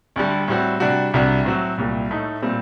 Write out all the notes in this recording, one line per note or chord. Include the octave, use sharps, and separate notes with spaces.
D2 D3 G3
A2 G3 C4 F#4
C3 G3 D4 F#4
C2 C3 G3 D4 F#4
A2 F#3 C4 F#4
C2 A#2 G3
A2 A3 D#4
A#2 G3 C4